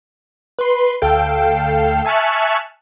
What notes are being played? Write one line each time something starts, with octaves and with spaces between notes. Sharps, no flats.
B4 C6
D2 A4 F5 G5
E5 G#5 A5 C#6 F6 F#6